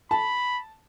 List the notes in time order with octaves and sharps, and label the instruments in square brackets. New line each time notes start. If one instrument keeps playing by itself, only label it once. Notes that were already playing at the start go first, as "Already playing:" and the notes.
[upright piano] A5 [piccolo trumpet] B5